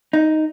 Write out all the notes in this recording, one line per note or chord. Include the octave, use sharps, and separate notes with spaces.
D#4